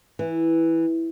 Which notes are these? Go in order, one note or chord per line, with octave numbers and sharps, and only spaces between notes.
E3